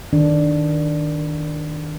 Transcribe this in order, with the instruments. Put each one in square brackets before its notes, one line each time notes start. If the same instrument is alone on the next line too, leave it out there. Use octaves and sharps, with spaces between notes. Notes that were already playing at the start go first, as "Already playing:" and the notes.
[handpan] D#3 D4